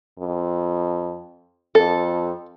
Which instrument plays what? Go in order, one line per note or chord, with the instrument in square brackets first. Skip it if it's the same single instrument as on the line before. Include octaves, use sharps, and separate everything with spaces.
[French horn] F2
[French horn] F2 [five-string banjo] A4